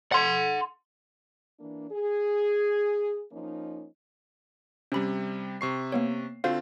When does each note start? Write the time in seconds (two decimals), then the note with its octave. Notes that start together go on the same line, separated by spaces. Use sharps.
0.12 F#5 C6
1.60 E3 A#3 D4
1.91 G#4
3.32 F3 A#3 C#4 D#4
4.92 C3 G3 C#4 B5
5.61 C3 C#6 C7
5.92 A#3 B3 C#5
6.44 D3 C4 F4 F#4 C5 F5